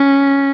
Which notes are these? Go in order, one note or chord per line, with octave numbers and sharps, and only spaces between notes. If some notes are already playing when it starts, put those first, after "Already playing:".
Already playing: C#4